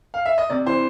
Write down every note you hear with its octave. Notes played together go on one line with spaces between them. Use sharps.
F5
E5
D#5
C3 D5
E3 C5